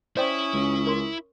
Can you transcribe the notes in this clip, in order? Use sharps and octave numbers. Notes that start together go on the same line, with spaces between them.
C#4 E4 C5 D5 G5 D#6
C#2
A#4 C6